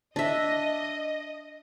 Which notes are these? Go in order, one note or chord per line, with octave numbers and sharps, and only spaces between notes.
D4 D#5 E5